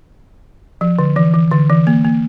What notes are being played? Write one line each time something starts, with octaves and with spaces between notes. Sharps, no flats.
F3
D3
E3
E3
D3
E3
A#3
A#3